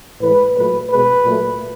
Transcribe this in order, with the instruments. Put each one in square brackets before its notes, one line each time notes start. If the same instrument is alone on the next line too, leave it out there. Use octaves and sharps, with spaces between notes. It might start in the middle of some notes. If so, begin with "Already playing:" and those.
[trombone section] A2 E3 G#3 B4
A#2 F#3 A3 B4
B2 G#3 B4
A#2 F#3 A3